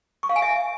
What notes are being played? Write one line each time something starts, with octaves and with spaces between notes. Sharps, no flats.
C#6
F5
G#5
E5